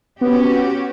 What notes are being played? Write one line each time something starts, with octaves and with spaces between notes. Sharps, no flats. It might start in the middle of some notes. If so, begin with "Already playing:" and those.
B3 C#4 F#4 G4